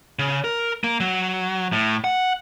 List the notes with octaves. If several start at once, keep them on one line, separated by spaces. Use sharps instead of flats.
C#3
A#4
A#3
F#3
A2
F#5